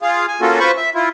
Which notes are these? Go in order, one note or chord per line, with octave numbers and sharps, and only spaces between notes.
F4 G#4 F5
G#5
A#3 C#4 F4 F#4 A4
F4 B4 C5 B5 C#6
E5
E4 F4